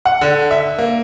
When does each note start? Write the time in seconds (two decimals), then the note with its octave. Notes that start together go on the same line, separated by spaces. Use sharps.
0.05 F#5
0.21 D3
0.51 E5
0.78 A#3